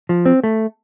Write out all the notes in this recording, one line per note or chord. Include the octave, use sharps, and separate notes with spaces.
F3
C4
A3